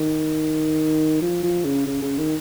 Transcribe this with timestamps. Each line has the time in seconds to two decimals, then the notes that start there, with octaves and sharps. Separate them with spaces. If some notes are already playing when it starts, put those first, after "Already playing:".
Already playing: D#3
1.22 F3
1.43 F3
1.64 C#3
1.86 C#3
2.03 C#3
2.18 D#3